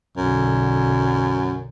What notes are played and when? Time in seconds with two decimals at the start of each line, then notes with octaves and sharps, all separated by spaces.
0.17 B1 F#2 D3